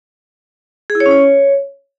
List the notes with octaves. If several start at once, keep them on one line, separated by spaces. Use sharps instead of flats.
G#4
E4
C#5
C#4
C#5